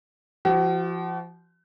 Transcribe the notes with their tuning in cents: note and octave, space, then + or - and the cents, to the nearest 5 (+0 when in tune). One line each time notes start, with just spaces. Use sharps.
F3 -20 F#4 +40